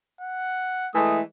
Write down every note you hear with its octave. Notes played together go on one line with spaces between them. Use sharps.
F#5
E3 G#3 A3 D#6